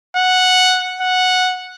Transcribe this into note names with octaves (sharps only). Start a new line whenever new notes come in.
F#5
F#5